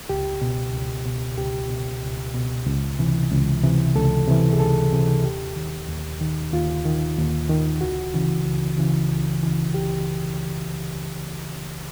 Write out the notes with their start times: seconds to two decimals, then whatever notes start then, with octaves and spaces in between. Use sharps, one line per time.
0.09 C#2 G4
0.41 B2
0.74 C#2
1.05 B2
1.38 C#2 G4
1.70 B2
2.02 C#2
2.34 B2
2.67 C#2
2.99 C3 E3
3.32 C#2
3.63 C3 E3
3.95 C#2 A4
4.27 C3 E3
4.53 G#4
4.60 C#2 A4
4.92 C3 E3
5.24 D#2 G4
5.56 D#3
5.88 D#2
6.21 D#3
6.52 D#2 F4
6.85 D#3
7.18 D#2
7.49 D#3
7.81 C#2 F#4
8.14 C#3 E3
8.45 C#2
8.78 C#3 E3
9.10 C#2
9.42 C#3 E3
9.74 C#2 G4